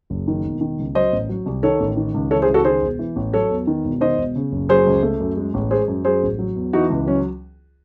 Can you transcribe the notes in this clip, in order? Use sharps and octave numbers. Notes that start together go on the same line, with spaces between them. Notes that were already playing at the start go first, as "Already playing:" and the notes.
F#1
D#3
E1
D#3
C#2
F#3 C5 D#5
A1
F#3
C2
D#3 A4 C#5
A1
D#3
C#2
E3 A4 C#5
G#4 C5
C#2
F#4 A4
D#3 G#4 C5
E1
E3
A1
F#3 A4 C#5
E2
D#3
E1
D#3 C5 D#5
E1
C#3
F#1
F#3 G#4 C5
C#2
A3
F#2
G#3
A1
G#3 G#4 C5
F#2
F#3 G#4 C5
A1
F#3
E2
E3 D#4 F#4
C#2
F#3 C#4